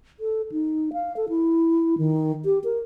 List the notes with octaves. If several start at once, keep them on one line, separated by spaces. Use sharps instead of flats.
A4
D#4
F5
A4
E4
D#3
G4
A#4